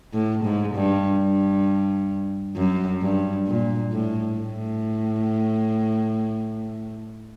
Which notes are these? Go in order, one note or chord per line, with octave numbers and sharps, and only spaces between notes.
A2
G#2
G2
G2
F#2
G2
A#2
A2
A2